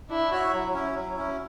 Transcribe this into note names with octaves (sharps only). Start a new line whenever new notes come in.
D4 E4
F#4 C#5 E5
F#3
C#4 E4
F#3
C#4 E4